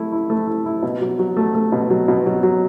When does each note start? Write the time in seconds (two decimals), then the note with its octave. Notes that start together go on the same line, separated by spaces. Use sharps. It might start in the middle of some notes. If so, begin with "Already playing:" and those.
Already playing: A3 E4
0.12 E4
0.30 A3
0.47 E4
0.66 E4
0.83 B2
1.01 F#3
1.19 F#3
1.37 A3
1.55 A3
1.72 B2
1.90 F#3
2.08 B2
2.26 F#3
2.43 F#3